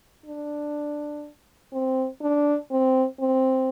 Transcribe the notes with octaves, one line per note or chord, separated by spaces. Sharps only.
D4
C4
D4
C4
C4